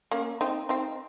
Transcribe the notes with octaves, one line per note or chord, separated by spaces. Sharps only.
A#3 C#4
C4 D#4
C4 D#4